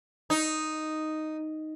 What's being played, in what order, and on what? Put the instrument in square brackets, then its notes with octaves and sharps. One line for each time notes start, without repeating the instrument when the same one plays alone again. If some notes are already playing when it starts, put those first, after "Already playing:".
[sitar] D#4